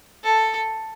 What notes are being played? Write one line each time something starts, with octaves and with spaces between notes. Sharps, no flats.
A4